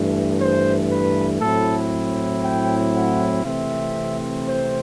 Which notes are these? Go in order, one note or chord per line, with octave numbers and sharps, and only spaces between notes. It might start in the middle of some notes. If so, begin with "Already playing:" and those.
Already playing: G2 E3 A3
C5
B4
A2 F#3 C4 E4 A4
G5
F#5
C3 E3 A3 C4 E5
C5